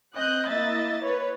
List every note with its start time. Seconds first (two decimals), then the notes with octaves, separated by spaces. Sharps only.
0.17 C4 D#5 F#6 G6
0.50 A#3 E4 D#5 E5 A6
1.03 B4 C#5